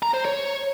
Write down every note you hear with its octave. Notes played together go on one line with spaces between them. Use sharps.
A#5
C5
C#5